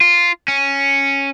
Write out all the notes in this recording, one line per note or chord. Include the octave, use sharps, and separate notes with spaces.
F4
C#4